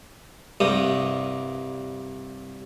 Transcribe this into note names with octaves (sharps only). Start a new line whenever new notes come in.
C2 G2 G3 D#6